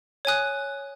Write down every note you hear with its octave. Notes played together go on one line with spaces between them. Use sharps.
C#5 G#5 D#6 F#6